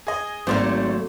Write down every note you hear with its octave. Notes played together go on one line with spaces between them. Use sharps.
G#4 D#5
G#1 F#3 A3 A#3 C5 D5 C6